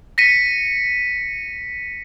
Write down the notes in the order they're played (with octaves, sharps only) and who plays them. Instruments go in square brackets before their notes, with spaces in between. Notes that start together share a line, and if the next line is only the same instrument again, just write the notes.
[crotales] A#6 B6 C#7 D#7